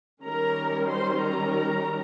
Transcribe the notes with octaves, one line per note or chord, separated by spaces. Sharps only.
D#3 G3 C#4 A#4 A#5
C5 C6
A#4 A#5